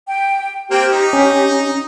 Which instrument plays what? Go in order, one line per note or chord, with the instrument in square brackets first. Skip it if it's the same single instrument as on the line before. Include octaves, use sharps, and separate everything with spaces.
[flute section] G5
[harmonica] A#3 C4 G5 [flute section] G4
[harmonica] D#4
[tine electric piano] C#4